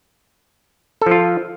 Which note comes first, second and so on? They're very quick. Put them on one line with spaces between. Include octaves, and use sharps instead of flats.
A4 F3 F4